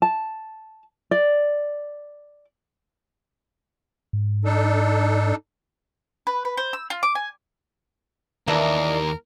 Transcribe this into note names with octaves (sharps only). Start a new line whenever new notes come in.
A5
D5
G#2
D4 D#4 A4
B4
B4
C5
E6
F4
D6
G#5
D#2 E3 D4 A#4 D#5